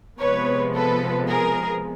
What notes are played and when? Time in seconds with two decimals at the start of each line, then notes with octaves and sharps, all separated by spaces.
0.19 C3 F3 G#3 B3 B4 C#5
0.74 A4 B4
1.28 G#4 A#4